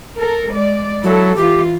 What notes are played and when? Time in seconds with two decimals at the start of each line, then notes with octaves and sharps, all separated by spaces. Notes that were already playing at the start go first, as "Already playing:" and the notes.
0.17 A4 A#4
0.52 G#3 D5
1.04 F#3 E4 A4
1.36 E3 F4 G4